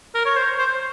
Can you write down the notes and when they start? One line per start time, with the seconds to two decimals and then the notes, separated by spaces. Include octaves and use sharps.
0.15 A#4
0.25 C#5
0.37 C5
0.58 C5